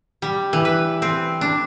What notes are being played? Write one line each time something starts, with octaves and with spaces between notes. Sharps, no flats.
G3
E3
B4
C4
D4